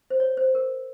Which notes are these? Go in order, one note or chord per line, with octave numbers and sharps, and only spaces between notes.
C5
C#5
C5
A#4